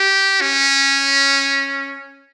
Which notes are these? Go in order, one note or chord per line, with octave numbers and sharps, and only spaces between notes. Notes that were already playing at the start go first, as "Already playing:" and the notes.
Already playing: G4
C#4